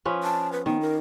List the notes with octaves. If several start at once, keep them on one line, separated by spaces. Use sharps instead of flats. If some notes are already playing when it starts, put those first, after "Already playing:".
F3 C#4 B4
A5
B4
D#3 B3
A#4